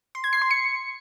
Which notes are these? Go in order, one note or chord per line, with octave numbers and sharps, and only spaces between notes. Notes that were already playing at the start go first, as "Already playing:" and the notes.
C6
G#6
C7
C6
C#7